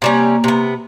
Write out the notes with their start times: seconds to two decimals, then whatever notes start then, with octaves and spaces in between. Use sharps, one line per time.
0.02 C3 G3 A#3 C#4 A#5
0.44 C3 B3